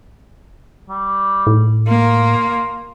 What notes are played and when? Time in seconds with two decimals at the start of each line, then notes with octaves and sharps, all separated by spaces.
0.89 G3
1.47 A2
1.88 A#3 F4